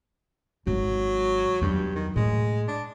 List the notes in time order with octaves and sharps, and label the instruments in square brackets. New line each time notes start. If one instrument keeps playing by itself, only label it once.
[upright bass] G#1 [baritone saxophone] F#3
[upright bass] E2 F#3 [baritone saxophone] G2
[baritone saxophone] D#3
[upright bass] A2 [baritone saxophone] G#3
[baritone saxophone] D4